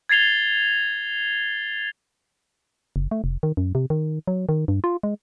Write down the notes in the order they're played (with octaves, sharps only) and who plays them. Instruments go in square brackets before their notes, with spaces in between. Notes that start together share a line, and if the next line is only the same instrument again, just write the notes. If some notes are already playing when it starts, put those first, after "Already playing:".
[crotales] G#6 A6 C7 F7 G7
[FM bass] F#1
A3
F1
D#3
F#2
C3
D#3
F#3
D#3
G2
F4
G#3